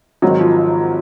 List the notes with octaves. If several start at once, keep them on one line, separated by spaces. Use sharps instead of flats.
G#1 G#2 D#3 F#3
F3